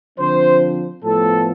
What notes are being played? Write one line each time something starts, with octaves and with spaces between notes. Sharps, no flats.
D3 F3 C4 C5
A2 F3 B3 A4